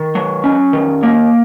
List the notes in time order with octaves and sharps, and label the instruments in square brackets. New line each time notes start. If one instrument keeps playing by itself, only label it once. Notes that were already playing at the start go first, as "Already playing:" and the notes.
Already playing: [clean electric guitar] D#3
F#3
C#4
D#3
A#3